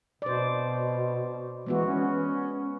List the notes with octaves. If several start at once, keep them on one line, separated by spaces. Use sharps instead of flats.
B2 C5 D5
E3 G#3 B3 F#4
C#4